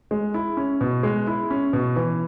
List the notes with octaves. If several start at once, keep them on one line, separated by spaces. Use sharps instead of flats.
G#3
E4
C#4
B2
G#3
E4
C#4
B2
E3